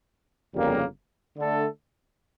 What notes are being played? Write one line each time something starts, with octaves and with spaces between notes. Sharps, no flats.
G1 F2 C#3 G3 A#3
D3 A3 D4 A4